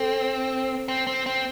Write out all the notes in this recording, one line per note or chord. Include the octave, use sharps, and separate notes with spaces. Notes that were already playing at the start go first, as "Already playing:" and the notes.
Already playing: C4 A4
C4
C4
C4